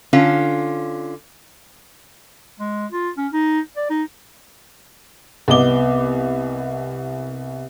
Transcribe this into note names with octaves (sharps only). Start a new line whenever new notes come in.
D3 C#4 F4
G#3
F4
C#4
D#4
D5
D#4
C2 B3 D#5 D6 G7